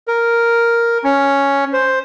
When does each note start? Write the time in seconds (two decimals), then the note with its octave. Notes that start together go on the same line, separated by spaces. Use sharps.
0.08 A#4
1.04 C#4
1.73 C5